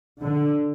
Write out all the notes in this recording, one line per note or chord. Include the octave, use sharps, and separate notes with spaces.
D3